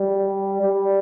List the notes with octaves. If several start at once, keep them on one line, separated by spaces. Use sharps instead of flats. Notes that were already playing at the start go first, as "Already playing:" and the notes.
Already playing: G3
G3